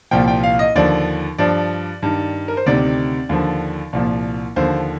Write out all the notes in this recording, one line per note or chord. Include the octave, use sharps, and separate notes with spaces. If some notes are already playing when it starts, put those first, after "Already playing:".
C2 A#2 F3 G5
G5
F5
D#5
D#2 D3 F3 D5
G2 F3 D5
G2 D#3
A#4
C5
D2 C3 D#3 D5
D#2 D3 F3
C2 A#2 F3
D#2 D3 F3 C5